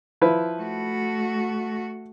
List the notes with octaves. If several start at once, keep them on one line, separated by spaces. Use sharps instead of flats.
F3 E4 B4
A3 F#4